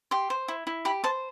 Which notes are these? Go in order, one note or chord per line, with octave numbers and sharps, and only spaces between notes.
G4 C6
C5
E4
E4
G4 B5
C5 A5